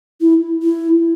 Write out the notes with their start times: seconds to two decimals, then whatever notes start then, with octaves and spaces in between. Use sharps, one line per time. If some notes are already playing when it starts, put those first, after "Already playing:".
0.21 E4
0.63 E4